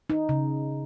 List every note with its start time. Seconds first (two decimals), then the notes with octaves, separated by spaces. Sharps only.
0.10 D#4
0.29 C#3